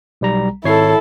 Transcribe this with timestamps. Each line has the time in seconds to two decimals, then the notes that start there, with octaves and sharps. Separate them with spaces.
0.21 B1 G3 A#5
0.64 G#1 E4 A4 C#5 C7